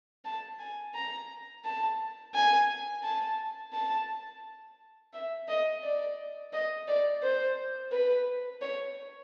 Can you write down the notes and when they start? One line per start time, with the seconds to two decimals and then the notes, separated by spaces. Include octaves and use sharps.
0.25 A5
0.59 G#5
0.95 A#5
1.65 A5
2.35 G#5
3.03 A5
3.73 A5
5.13 E5
5.48 D#5
5.83 D5
6.53 D#5
6.88 D5
7.22 C5
7.92 B4
8.62 C#5